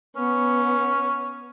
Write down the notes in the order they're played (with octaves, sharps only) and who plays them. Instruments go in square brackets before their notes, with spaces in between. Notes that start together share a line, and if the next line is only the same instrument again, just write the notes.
[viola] B3 [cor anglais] C#4